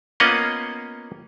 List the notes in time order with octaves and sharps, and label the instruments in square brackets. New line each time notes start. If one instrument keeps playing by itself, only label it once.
[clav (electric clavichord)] A#3 B3 C#4 F4 D#5 F#5